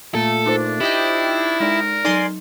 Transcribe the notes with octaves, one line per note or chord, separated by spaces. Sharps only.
A#2 A3 A4
D4 D#4 F4 C5
E4 G4 D#5 G5
G#3 D#4 A#4 D5
F#3 D#4 D5 G#5 C6